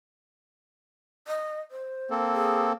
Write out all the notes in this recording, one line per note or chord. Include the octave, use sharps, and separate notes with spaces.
D#5
C5
A#3 C4 A4
G#4